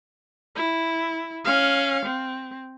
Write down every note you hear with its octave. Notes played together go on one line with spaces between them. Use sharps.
E4
C#4 F5
C4